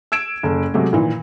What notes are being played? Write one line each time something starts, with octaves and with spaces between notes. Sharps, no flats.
E6 G#6 D7 E7
F#1 A4
C3 F#3 G#3 A3
A#2 D#3 E3